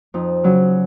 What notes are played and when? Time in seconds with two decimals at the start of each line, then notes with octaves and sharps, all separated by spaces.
0.14 F2 D#4
0.44 C#3 F#3